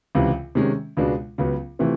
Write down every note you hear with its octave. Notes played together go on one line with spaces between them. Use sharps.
C#2 C3 E3
C3 D#3 G#3 C#4
C#2 B2 G#3 B3 D4
C#2 C#3 F#3 B3
C3 E3 A3 C4 F4